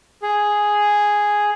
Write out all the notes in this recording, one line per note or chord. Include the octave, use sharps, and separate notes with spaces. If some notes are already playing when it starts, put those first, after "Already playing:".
G#4